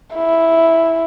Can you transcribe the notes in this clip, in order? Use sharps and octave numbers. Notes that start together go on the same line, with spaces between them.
E4